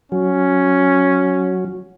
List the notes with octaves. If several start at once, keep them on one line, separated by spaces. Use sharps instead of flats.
F#3 C#4